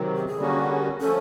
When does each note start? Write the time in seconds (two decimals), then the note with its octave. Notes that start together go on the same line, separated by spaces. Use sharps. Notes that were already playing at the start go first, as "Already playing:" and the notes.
Already playing: C3 D#3 F#3
0.16 G#4
0.27 G#4
0.37 D3 G3 A#3 C#4 F#4
1.01 F3 A3 C#4 A4